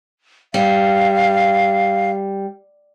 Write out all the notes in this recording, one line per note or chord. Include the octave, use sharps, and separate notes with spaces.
G3 F5